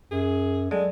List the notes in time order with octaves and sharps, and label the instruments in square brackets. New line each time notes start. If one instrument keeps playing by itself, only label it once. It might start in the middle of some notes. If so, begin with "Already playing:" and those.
[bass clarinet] F#2 [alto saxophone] G#4
[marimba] F#3 D5 [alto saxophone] G#3 [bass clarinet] A4